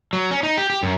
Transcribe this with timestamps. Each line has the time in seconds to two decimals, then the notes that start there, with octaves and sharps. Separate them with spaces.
0.13 F#3
0.31 C#4
0.43 D#4
0.57 G4
0.70 G4
0.83 F#2